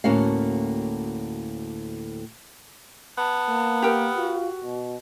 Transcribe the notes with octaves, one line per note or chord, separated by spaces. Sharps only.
D2 A2 A#3 C#4 F#4 F5
B3 A5
A#3
G4 A#4
F4 F#4
B2